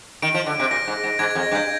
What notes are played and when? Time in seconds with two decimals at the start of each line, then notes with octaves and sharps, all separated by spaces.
0.22 D#3 D7
0.34 F3
0.46 D3
0.60 C3
0.71 A#2 A#6
0.88 G#2
1.04 G#2
1.19 G#2 G#6
1.31 G#6
1.35 F2
1.43 A#6
1.52 G2
1.55 G6